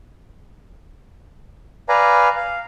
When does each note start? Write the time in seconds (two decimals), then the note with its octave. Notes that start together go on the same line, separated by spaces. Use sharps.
1.89 B4 D5 F5 G#5 A#5
2.36 F5